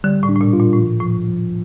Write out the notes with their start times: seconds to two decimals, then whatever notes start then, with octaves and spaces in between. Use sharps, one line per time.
0.04 D3 G3
0.23 A2
0.29 D4
0.36 A2
0.41 A#2
0.53 F4
0.59 A#2
0.73 A2
0.79 F3
1.00 A2 F3
1.28 F3